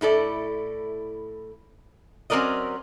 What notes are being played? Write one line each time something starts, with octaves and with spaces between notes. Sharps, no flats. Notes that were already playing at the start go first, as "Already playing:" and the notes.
A2 E4 A4 D5
F#3 C4 C#4 A#4 D5 D#5